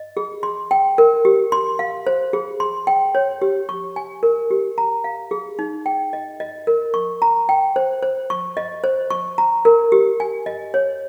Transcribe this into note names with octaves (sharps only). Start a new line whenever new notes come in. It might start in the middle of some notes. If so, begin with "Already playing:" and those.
Already playing: D#5
G#4
C6
G5
A#4
G4
C6
F5
C5
G#4
C6
G5
C#5
G4
C#6
G#5
A#4
G4
A#5
F5
G#4
D#4
G5
D#5
D#5
A#4
C#6
A#5
G5
C5
C5
C#6
D#5
C5
C#6
A#5
A#4
G4
G#5
D#5
C#5